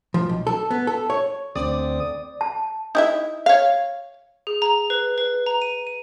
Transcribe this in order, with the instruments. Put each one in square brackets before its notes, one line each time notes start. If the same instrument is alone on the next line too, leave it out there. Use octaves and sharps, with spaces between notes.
[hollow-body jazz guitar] F3
B1
A4
B3
A4
C#5
[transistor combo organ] D2 C4 D#6 [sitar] D5
[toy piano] A5
[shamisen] D#4 E4 E5
C#5 F5
[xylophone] G#4
A#5
B4
B4
A#5
D#7
D#7